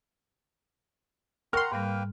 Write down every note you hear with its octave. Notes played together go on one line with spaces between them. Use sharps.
A#4 F#5 G5 A#5 C6 C#6 F6
G#2 G3 A#3 B4 G5